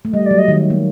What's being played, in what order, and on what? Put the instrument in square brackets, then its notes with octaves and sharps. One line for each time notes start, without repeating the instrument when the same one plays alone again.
[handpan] A3
[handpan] G3 [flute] D#5
[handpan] F#3 [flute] D5
[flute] D#5
[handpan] D#3
A#3